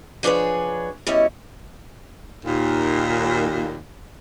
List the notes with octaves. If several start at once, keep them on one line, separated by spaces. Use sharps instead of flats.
F3 D4 G#4 B4 C#5
B2 G3 C#4 E4 D#5
D#2 A#2